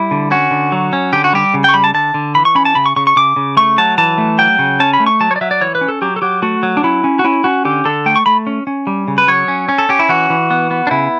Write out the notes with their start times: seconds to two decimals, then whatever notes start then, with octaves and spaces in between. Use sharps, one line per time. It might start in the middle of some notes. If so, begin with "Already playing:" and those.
Already playing: G3 E4
0.11 D3
0.31 C#4 F#4
0.51 D3
0.72 F#3
0.93 C#4
1.13 D3 G4
1.24 F#4
1.33 G3 G4
1.54 C#3
1.64 G5 C#6
1.74 G3 B5
1.84 A5
1.94 D3 A5
2.14 D3
2.35 E3 B5
2.45 C#6
2.55 C#4 B5
2.65 A5
2.75 C#3 B5
2.86 C#6
2.96 C#3 C#6
3.07 C#6
3.16 C#3 D6
3.36 C#3
3.57 A3 C#6
3.78 F#3 A5
3.98 E3 A5
4.18 A3
4.38 F#3 G5
4.59 C#3
4.80 C#4 A5
4.93 B5
5.00 A3
5.06 C#6
5.21 F#3 A5
5.31 C#5
5.36 D5
5.41 F#3 E5
5.51 D5
5.61 E3 C#5
5.75 B4
5.81 C#4
5.88 A4
6.02 F#3 G4
6.16 A4
6.22 F#3 G4
6.42 A3 F#4
6.63 F#3
6.77 D4
6.83 C#4 E4
7.04 C#4
7.19 F#4
7.24 C#4 E4
7.44 C#4 F#4
7.65 D3 G4
7.85 D3 A4
8.06 A3 G5
8.16 C#6
8.26 A3 B5
8.47 C#4
8.67 C#4
8.87 G3
9.08 C#3
9.18 B4
9.28 F#3 C#5
9.48 C#4
9.69 C#4
9.78 A4
9.89 C#4 G4
9.99 E4
10.09 E3 F#4
10.30 E3
10.50 B3
10.71 B3
10.87 D4
10.91 C#3 E4